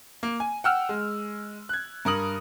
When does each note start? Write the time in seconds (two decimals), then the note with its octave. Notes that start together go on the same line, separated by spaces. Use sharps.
0.23 A#3
0.40 G#5
0.64 F#5 G5 E6 F6
0.89 G#3
1.69 F#6 G#6
2.05 G2 A#4 D#6 F#7